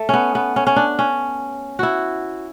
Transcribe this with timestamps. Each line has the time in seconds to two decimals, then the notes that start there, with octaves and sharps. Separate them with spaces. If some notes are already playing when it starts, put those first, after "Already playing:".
Already playing: A3
0.09 B3 C#4
0.35 B3
0.56 C#4
0.67 C#4
0.76 D4
0.99 C#4
1.79 E4 F#4